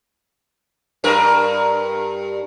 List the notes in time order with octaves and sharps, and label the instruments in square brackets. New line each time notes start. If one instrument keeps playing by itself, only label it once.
[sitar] G2 A#4